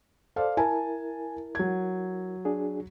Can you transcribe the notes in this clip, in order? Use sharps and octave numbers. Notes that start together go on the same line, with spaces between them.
A4 C5 D5 F5
E4 A#4 G#5 A5
F#3 G#6
D4 F#4 G#4